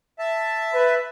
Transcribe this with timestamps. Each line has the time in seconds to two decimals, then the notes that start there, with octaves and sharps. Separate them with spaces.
0.19 E5 A5
0.74 B4